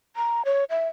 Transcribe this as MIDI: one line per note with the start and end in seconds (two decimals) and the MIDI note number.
0.16 0.42 82
0.45 0.64 73
0.70 0.88 76